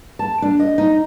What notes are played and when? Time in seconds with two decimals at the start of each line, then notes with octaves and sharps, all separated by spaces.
0.19 A5
0.42 D4
0.59 D#5
0.78 D#4